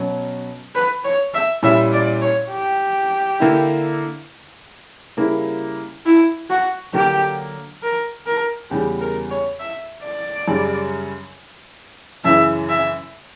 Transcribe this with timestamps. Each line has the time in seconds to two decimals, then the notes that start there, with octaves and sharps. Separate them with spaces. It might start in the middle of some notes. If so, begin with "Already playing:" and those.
Already playing: B2 F#3 C#4
0.75 B4
1.04 C#5
1.34 E5
1.63 A#2 G3 C#4 E4 E5
1.93 D5
2.22 C#5
2.51 G4
3.40 D3 A#3 E4
5.17 C#3 G3 A#3 E4
6.06 E4
6.50 F#4
6.93 D3 F#3 A#3 G4
7.83 A#4
8.26 A#4
8.70 E2 C#3 G3 G4
9.01 A#4
9.30 C#5
9.59 E5
10.04 D5
10.47 F#2 C#3 G3
12.24 F#2 C#3 E3 E5
12.69 E5